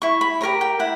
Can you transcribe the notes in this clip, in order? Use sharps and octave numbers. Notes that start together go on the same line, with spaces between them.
E4 C#6
B5
G4 A#4 C#5 A#5
G5
E4 F#5